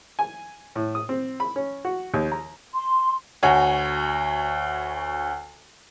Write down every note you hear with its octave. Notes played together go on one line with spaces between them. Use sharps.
G#5
A2
D#6
C4
B5
C#4
F#4
D#2
A#5
C6
D2 F#4 C#5 G#5